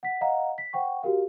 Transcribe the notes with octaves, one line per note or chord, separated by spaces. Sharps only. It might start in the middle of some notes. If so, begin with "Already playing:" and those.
F#5 B6
D#5 F5 F#5 A#5
B6
C5 F#5 G5 C#6
F#4 G4 A#4 F5